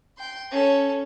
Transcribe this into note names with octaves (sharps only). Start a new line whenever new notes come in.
G5 C6
C#4 A4